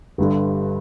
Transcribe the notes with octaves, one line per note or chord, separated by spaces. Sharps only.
G1 G2 D3